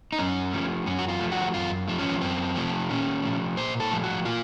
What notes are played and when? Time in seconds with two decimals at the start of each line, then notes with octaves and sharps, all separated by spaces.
0.12 D#4
0.19 F#2 C#4
0.53 F3 A3
0.86 F#2 C#4
0.99 F#4
1.08 F4
1.20 F3 A3
1.32 F#4
1.54 F#2 F4
1.88 F3 A3
1.99 C#4
2.22 F#2 C4
2.56 F3 A3
2.90 A#2 C#4
3.23 F3 A3
3.57 A#2 C5
3.80 A4
3.91 F3 A3
4.03 F#4
4.25 A#2 F4